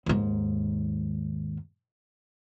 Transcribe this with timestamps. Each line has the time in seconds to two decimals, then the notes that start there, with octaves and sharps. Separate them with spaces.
0.06 D#2 G#2